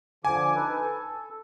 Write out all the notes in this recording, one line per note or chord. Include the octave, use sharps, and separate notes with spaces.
D3 F3 G#5 D6
D#4 A4 B4
A4